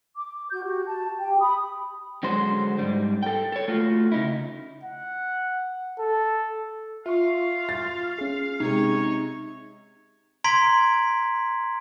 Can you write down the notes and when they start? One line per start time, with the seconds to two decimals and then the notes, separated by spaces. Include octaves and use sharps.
0.16 D6
0.51 F#4 G6
0.63 F#4 G4
0.86 A5
1.19 G4 G5
1.40 B5 D#6
2.23 F#2 D3 F#3 G#3 C5
2.79 G#2 G3
3.23 A4 G5
3.52 A4 C#5
3.68 A3 F4 F#4
4.12 C#3 D#4 E4
4.83 F#5
5.99 A4
7.06 F4 E5 F5 C#6
7.69 A6
8.19 C#4 G#4
8.60 C3 G#3 D#4 C#5
10.44 A#5 C6 G#6 B6 D7 F#7